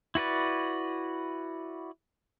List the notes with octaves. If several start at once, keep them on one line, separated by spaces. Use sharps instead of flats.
E4 F#4 B4 D5